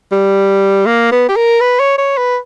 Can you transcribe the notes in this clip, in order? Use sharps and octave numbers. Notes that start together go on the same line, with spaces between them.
G3
A#3
B3
G4
A#4
B4
C#5
C#5
B4